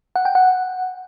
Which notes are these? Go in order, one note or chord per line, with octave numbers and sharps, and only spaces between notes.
F#5
G5
F#5